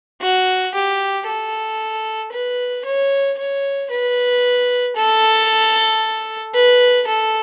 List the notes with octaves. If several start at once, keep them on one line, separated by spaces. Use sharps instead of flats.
F#4
G4
A4
B4
C#5
C#5
B4
A4
B4
A4